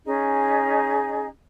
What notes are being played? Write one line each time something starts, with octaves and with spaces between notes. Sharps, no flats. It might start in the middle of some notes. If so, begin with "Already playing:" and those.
C#4 D#4 G#4 D#5